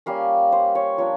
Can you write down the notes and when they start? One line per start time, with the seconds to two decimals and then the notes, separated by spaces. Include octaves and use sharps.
0.06 G3 A#3 C#4 F5
0.52 C5
0.75 C#5
0.98 F3 A#3 D4 C#5